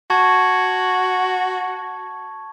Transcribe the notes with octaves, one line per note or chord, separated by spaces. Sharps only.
F#4 A5 C#6 G#6